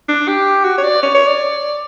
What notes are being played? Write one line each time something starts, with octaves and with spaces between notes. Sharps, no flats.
D4
G4
F#4
C#5
D5
C#5
C#5
D5